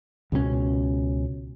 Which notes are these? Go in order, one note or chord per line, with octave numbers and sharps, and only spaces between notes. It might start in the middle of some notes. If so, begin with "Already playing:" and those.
C#2 B2 F#3 C#4